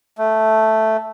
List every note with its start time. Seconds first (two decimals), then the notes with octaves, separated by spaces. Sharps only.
0.18 A3